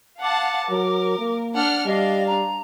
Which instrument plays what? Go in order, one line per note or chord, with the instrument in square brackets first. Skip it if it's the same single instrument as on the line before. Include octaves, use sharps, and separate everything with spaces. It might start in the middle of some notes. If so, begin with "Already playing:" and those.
[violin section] F5 F#5 A5 [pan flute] D6
[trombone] F#3 [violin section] A#4
[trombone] A#3
[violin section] D4 F#5 F6
[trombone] G3 [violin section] D4 F5 [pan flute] D#5
[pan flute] A#5